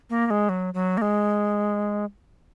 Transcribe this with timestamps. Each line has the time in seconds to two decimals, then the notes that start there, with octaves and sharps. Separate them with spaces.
0.10 A#3
0.26 A#3
0.30 G#3
0.49 F#3
0.74 F#3
0.97 A#3
1.02 G#3